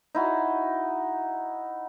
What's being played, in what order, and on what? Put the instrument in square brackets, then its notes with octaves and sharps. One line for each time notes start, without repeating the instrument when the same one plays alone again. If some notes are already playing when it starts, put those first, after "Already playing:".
[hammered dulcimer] D#4 E4 F#4